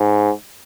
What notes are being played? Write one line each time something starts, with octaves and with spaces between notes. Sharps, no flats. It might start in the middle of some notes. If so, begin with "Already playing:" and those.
Already playing: G#2